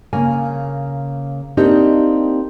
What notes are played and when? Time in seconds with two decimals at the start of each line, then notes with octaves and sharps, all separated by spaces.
0.13 C#3 A#3 G#5
1.57 A#3 C4 D4 D#4 G4